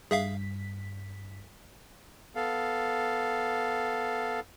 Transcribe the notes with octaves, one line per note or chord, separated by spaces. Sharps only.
G2 G#4 E5 F5 B6
B3 A4 F5